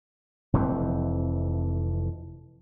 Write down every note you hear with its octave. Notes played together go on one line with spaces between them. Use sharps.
F1 F2 E3 C4